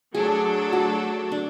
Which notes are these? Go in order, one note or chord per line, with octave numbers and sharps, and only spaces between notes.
F#3 A3 D4 G#4 A4
F#4
D4